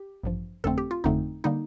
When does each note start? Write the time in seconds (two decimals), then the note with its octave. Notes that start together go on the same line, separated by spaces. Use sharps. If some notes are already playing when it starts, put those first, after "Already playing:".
Already playing: G4
0.23 A1 G2 F3
0.64 G1 F2 D3 A3 C4 A4
0.78 G4
0.91 F4
1.04 G1 F2 D3 A3 C4 D#4
1.44 D3 G3 A#3 D#4